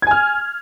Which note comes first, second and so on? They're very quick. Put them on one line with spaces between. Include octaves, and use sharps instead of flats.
G#6 G#5 F6